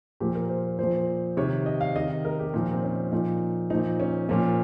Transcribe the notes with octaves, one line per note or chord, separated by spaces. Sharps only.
A#2 F3 G4
A#4
C5
A#2 F3 C5
C3 D#3 C#5
D#5
F5
C3 D#3 D#5
A#4
G4
A#2 F3 D#4
C4
C#4
A#2 F3 D#4
A#2 F3 D#4
C#4
A#2 F3 C#4